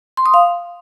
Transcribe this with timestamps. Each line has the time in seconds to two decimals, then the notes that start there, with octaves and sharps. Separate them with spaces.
0.17 C6
0.26 D#6
0.34 F5